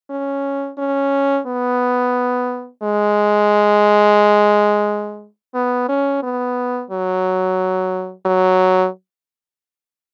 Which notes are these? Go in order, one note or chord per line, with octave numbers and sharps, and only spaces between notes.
C#4
C#4
B3
G#3
B3
C#4
B3
F#3
F#3